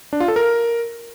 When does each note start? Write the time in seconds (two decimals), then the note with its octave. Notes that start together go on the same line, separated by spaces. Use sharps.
0.13 D4
0.20 F4
0.28 A4
0.36 A#4